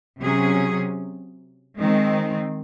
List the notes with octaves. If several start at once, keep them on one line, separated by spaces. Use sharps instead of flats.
C3 F#3 C#4 G#4
D#3 G#3 C4